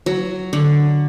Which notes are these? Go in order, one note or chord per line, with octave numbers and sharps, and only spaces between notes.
F#3
D3